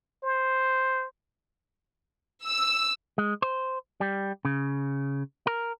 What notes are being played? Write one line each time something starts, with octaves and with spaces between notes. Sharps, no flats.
C5
E6
G#3
C5
G3
C#3
A#4